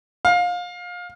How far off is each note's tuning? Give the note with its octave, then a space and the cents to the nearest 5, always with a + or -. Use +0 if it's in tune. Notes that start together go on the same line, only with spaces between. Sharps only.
F5 +25